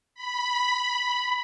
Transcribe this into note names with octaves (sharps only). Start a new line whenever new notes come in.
B5